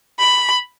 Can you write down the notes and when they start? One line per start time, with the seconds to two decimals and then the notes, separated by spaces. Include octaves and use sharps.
0.19 B5